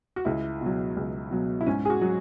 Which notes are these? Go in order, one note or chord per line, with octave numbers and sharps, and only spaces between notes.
F#4
C#2 E4
B2 F#3
C#2
B2 F#3
E4
G#2 C#4
G#4
F#4
F#3